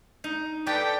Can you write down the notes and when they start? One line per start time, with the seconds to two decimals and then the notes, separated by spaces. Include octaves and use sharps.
0.24 D#4
0.67 G4 A4 B4 D5 G5